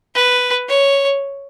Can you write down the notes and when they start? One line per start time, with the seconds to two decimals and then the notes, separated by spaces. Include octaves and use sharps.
0.15 B4
0.69 C#5